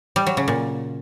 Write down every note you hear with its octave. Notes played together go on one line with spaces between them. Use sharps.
G3
F#3
C#3
A#2